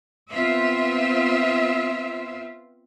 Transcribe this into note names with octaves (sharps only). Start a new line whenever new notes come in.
B3 C4 F4 C5 E5